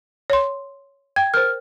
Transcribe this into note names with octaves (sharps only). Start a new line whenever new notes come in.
C#5 C6
G5 G#6
A#4 C5 F6